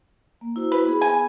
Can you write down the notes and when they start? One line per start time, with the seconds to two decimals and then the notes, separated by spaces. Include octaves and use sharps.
0.41 A#3
0.56 E4 F#4 C5
0.72 B4
0.86 B3 G#4 B5
1.01 G#5